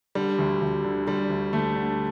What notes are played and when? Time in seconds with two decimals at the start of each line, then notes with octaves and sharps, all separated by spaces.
0.15 D3 G3
0.39 D2
0.61 D2
0.84 D3
1.07 D3 G3
1.30 D2
1.53 D2 A3
1.76 D3